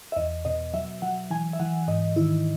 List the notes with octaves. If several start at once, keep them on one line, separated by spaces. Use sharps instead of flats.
E5
E2 D#5
B2 D#5
F#3 E5
F#3 F#5
E3 G#5
E5
E3 F#5
G#2 D#5
D#3 E4